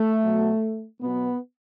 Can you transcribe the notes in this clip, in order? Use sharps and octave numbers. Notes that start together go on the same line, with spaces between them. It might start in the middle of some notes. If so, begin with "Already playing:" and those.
Already playing: A3
B2 F#3
B2 F#3 B3